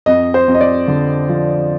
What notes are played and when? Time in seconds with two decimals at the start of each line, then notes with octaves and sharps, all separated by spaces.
0.06 F2 D#5
0.34 C5
0.48 F2
0.54 D#5
0.61 D5
0.88 D3
1.29 F3